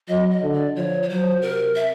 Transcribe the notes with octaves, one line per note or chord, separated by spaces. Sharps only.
F#3 D#5
D#5
D3
D5
F3 C#5
C#5
F#3 C5
C3 A#4
E5